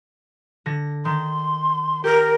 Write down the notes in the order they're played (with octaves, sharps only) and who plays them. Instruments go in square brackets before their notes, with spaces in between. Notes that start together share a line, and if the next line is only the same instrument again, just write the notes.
[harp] D3 A#6
[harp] D#3 [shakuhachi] C6
[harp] G4 [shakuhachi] A#4